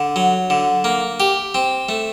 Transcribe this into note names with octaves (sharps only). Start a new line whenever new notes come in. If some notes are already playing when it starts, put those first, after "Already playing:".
Already playing: D3
F#3
D3
A#3
G4
C4
A3